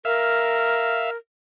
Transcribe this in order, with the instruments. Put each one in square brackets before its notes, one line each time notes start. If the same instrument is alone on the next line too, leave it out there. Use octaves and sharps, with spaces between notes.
[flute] A#4 [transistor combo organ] E5 F5